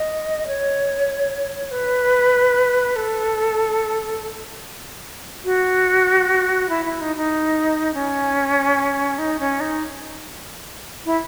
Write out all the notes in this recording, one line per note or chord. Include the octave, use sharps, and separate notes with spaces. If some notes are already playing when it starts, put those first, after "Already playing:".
Already playing: D#5
C#5
B4
A4
F#4
E4
E4
D#4
D#4
C#4
D#4
C#4
D#4
E4